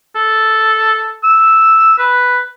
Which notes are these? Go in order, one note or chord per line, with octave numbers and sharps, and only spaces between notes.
A4
E6
B4